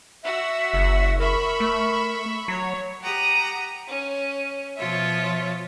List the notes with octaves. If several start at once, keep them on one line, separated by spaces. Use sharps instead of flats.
F#4 E5 F#5 E6
F#1
A#4 E5 B5 C#6
A3
F#3 C#5
G4 F#5 A#5 D#6
C#4
B2 F3 F4 C#5 E5